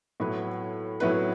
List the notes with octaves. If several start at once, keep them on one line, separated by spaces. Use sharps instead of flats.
A2 F#3 B3 E4 B4
A2 F#3 B3 E4 B4